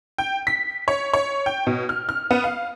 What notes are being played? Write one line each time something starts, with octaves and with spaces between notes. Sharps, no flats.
G5
B6
C#5
C#5
G5
B2
F6
F6
B3
F5